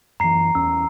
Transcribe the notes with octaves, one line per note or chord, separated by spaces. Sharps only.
F#2 E3 A#5 C7
E2 C#4 E6